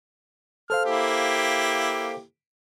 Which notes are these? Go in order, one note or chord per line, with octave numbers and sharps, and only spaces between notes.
A4 C5 F5 F6
A#3 E4 G4